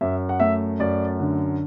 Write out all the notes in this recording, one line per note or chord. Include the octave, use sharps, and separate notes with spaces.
F#2 E5
F#5
A3 E5
F#2 D5
D3